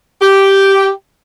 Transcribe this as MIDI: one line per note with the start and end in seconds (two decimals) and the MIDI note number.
0.21 0.89 67